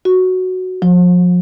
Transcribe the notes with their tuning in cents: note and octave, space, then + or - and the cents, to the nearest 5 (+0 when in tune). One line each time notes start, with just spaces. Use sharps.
F#4 +0
F3 +35